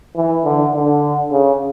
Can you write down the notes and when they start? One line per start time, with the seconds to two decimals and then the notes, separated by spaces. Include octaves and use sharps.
0.16 E3
0.44 D3
0.74 D3
1.31 C#3